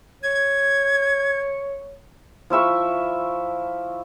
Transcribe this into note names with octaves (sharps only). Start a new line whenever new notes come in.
C#5 G#6
F3 E4 E5 C#6